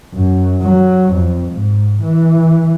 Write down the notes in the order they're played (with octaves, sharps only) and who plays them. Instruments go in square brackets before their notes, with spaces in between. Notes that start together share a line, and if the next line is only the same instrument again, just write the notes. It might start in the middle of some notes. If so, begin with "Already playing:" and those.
[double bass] F#2
F#3
F2
G#2
E3